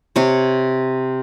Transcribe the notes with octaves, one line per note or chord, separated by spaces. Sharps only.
C3 C#5